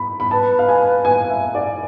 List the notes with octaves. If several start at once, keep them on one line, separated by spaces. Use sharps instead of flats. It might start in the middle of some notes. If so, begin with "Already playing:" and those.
Already playing: B5
B5
B4 A5
F5
G#5
G#5
E5
D5